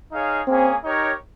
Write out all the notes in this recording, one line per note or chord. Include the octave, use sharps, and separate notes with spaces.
D#4 G#4 C#5 F5
A#3 C4 C#4 G#4
D#4 G4 A#4 C#5